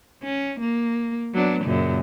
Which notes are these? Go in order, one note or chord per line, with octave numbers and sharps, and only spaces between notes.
C#4
A#3
F#3 B3 D4
F#2 A#2 C#3